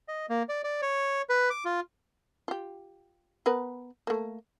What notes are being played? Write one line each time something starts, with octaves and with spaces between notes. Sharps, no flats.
D#5
A#3
D5
D5
C#5
B4
D6
F4
F4 G4
B3 A#4 B4
A3 A#3